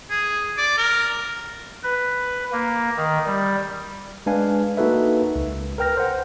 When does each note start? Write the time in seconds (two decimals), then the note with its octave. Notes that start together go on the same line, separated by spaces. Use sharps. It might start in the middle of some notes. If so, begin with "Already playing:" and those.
0.10 G#4
0.58 D5
0.77 A#4
1.84 B4
2.52 A#3
2.96 D#3
3.26 G3
4.26 G#3 D4 B4 F5 G#5
4.77 A#3 D#4 F#4 A4 B4 E5
5.36 C#2
5.78 A#4 B4 G5 F6 A#6
5.97 C5 F#5